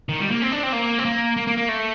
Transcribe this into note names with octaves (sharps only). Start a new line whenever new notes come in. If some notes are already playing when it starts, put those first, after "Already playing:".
D#3
G3
A#3
C4
D4
C4
A#3
C4
A#3
A#3
A#3
A#3
A3